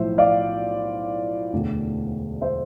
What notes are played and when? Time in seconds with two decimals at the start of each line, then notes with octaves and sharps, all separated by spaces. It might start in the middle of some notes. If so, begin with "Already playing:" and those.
Already playing: B1 A2 F3 C5 E5
0.18 D5 F5
1.52 E1 D2 D3
2.41 C5 E5